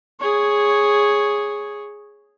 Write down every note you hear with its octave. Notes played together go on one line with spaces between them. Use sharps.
G#4 C#5